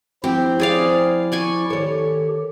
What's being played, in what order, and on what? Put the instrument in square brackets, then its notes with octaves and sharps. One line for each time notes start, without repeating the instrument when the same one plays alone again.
[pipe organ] F3 E4 [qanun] C4 [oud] G4
[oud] C4 [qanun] G#4 D5 F5
[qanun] D5 G#5 C#6
[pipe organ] D#3 G4 [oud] A4 C#5